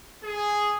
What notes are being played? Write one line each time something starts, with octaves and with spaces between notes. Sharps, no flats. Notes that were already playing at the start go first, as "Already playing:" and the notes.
G#4